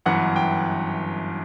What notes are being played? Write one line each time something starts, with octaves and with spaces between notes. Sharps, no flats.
G1 F#2 E3 F#5
G5